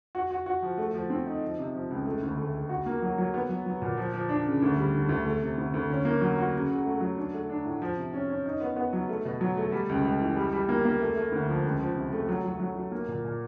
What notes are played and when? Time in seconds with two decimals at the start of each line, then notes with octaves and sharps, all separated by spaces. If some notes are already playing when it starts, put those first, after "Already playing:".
0.15 F#4
0.31 F#4
0.46 F#4
0.62 F3
0.78 A3
0.94 F3
1.10 C4
1.27 D#4
1.43 F3
1.59 C3
1.75 F3
1.90 C#2
2.06 A3
2.23 D2
2.37 A3
2.53 A3
2.69 F#4
2.86 A#3
3.02 F#3
3.18 F#3
3.34 B3
3.49 F#3
3.66 F#3
3.82 A#2
3.97 F3
4.13 F3
4.29 D4
4.45 C#3
4.62 D2
4.77 G3
4.94 D3
5.09 D2
5.25 A3
5.42 C3
5.58 D2
5.74 D2
5.90 C#4
6.05 A#3
6.21 F#3
6.38 F#4
6.54 C#3
6.69 C#3
6.86 A3
7.01 F#3
7.17 D4
7.33 A3
7.49 D4
7.65 A2
7.82 F3
7.96 C3
8.13 C#4
8.29 C#4
8.46 D#4
8.61 B3
8.76 B3
8.93 F#3
9.09 A3
9.25 B2
9.41 F#3
9.57 A3
9.72 G3
9.89 C#2
10.05 C#2
10.21 E3
10.37 G3
10.53 G3
10.69 A#3
10.85 A#3
11.01 A3
11.16 A3
11.32 D2
11.49 F3
11.64 C#2
11.80 F3
11.96 C3
12.13 A3
12.29 F#3
12.45 F#3
12.60 F#3
12.76 F#3
12.92 A#3
13.08 A#2
13.25 A#2